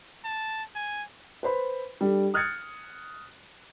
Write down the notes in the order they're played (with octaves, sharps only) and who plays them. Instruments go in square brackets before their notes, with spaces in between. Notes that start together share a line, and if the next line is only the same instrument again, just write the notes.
[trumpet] A5
G#5
[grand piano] B4 C5 B5
G3 D4 A4
D#6 F6 F#6 G#6 A6 C#7